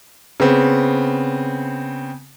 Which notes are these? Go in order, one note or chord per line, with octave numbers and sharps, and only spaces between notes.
C#3 B3 C4